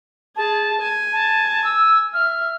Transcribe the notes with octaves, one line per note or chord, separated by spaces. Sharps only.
G#4 A5
G#5
A5
E6
E5 F6